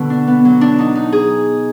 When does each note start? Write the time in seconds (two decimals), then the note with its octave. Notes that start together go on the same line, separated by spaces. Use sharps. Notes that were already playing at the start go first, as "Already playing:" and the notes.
Already playing: B2 D3 B3
0.10 D4
0.27 B3
0.45 F#3
0.61 D4
0.79 D#4
0.95 D#4
1.12 G#4